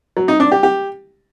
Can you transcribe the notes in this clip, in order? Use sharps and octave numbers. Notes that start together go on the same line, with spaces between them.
F#3
D#4
D4
G4
G4